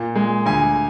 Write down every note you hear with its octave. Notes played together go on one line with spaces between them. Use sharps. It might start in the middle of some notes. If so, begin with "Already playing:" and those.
Already playing: A#2
G#3
D2 G#5